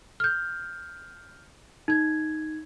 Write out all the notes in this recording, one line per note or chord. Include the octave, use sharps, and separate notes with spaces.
F6 G6
D#4 G#6